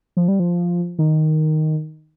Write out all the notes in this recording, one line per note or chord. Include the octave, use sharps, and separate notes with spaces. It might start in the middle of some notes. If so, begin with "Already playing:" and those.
F3
G3
F3
D#3